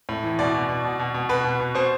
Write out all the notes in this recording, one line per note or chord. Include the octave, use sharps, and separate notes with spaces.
A2
E3
B2 D5
B2
B2
B2
B2
B2
B2 B4
B2
B2
B2 C5